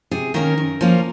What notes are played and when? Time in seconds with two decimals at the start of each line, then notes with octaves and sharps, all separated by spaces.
0.11 C3 G#4
0.34 D#3 A#3 C#4 A#4
0.58 F#2
0.81 F3 A#3 C#4